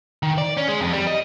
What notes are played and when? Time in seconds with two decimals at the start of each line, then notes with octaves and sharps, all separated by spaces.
0.23 D#3
0.38 D5
0.57 C#4
0.68 G#3
0.81 F2
0.93 G3
1.07 D#5